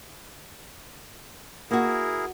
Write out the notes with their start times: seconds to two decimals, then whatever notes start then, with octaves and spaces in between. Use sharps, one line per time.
1.71 A#3 E4 F#4 G#4 A#4